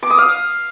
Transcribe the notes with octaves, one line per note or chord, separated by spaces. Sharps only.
D6
D#6
F5